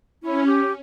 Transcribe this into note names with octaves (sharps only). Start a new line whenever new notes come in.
C#4 E4
G4